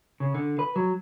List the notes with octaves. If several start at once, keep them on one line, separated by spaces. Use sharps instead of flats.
C#3
D3
B4
F#3